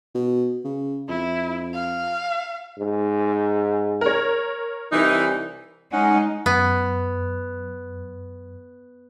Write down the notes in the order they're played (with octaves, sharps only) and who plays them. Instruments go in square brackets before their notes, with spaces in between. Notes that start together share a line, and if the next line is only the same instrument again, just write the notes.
[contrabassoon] B2
C#3
[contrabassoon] F2 [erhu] E4
[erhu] F5
[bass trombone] G#2
[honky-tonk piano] A#4 C#5
[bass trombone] C2 [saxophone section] E3 D#4
[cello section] G#3 D#4 [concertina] C#4 F#5
[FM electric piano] F#2 [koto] B3